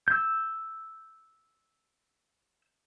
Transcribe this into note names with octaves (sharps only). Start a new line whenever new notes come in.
E6 G6